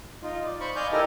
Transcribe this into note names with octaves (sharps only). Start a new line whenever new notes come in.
D#4 F4
D5
C5 B5 C#6
D5 D#5 F5 G#5 G6
D#4 E4 G4 A4 A#4 D#5